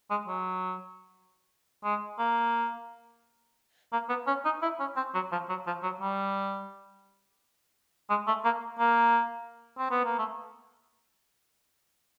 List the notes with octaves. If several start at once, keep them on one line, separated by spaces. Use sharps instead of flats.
G#3
F#3
G#3
A#3
A#3
B3
C#4
D#4
E4
C#4
C4
F#3
F3
F#3
F3
F#3
G3
G#3
A3
A#3
A#3
C4
B3
A#3
A3